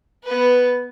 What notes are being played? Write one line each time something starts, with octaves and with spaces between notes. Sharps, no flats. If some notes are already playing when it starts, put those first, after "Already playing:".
B3 B4